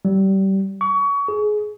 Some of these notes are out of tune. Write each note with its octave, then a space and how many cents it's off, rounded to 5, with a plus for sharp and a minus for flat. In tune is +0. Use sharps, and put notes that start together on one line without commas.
G3 -25
C#6 +30
G#4 +20